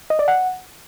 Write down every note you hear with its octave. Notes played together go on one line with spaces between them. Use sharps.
D#5
D5
F#5